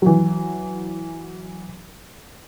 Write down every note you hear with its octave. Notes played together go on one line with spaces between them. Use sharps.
E3 F#3